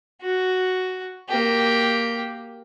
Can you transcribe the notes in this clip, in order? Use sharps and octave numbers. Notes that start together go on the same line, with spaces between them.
F#4
A#3 G4